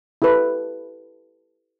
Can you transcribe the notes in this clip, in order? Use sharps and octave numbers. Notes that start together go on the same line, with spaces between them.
E4 G4 A4 B4